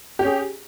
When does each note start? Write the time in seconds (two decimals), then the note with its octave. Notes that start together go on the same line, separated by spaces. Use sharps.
0.19 G4
0.23 C#4
0.26 G#4